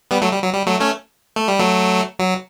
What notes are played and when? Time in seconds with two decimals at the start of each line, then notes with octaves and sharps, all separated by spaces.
0.11 G3 B3
0.22 F#3 A3
0.32 G3
0.42 F#3
0.53 G3
0.67 F#3 A3
0.81 A3 C#4
1.36 A3
1.48 G3
1.59 F#3 A3
2.19 F#3